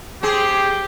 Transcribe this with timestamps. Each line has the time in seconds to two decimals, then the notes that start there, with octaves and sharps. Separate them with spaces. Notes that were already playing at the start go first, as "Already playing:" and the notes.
0.23 C4 G4 G#4